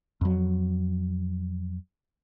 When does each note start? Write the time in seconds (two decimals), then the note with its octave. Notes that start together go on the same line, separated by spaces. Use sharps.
0.21 F2 F#3